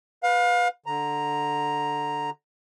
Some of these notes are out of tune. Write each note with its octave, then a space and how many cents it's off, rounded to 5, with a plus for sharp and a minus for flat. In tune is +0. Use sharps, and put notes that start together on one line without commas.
B4 +0 F5 +30
D3 +0 A#5 +0